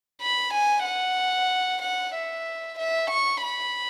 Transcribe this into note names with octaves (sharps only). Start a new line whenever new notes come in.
B5
G#5
F#5
F#5
E5
E5
C#6
B5